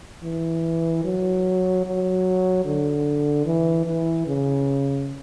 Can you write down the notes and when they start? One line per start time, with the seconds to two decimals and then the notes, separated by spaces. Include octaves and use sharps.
0.23 E3
1.04 F#3
1.85 F#3
2.65 D3
3.45 E3
3.86 E3
4.27 C#3